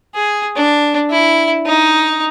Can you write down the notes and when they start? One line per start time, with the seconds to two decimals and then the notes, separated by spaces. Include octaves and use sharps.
0.15 G#4
0.56 D4
1.11 E4
1.67 D#4